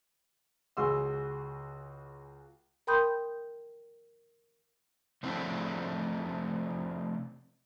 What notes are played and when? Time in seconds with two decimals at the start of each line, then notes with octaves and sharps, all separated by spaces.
0.77 C#2 G#3 F#4 G#4 C6 E6
2.87 A#4 G5 B5 C6 D#6 G6
5.23 C3 F3 A3 C4 D4 E4